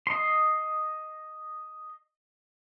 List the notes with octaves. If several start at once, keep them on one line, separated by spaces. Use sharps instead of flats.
D#5 C6